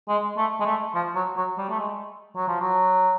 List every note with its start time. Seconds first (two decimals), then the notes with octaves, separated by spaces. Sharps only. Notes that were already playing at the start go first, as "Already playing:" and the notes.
0.08 G#3
0.37 A3
0.60 G#3
0.66 A3
0.95 F3
1.15 F#3
1.37 F#3
1.58 G3
1.69 A3
1.79 G#3
2.36 F#3
2.48 F3
2.60 F#3